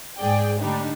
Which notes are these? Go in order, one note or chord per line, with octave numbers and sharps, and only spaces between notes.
G#2 G#4 D5 G5
A2 D3 G3 D4 D#4